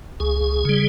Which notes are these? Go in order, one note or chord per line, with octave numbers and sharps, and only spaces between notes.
C#2 G#4
C#3 G3